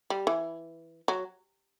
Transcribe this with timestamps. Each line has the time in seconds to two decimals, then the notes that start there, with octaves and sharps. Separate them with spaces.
0.10 G3
0.27 E3
1.08 F#3